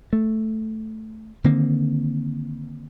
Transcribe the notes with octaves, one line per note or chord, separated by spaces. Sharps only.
A3
D3 D#3 A#3 C4